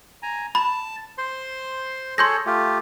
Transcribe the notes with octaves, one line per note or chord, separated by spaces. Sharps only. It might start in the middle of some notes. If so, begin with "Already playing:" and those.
G#5 A#5
A5 B5
C5 C6
G#4 A4 C#5 C6 G6 A#6
A3 F4 G4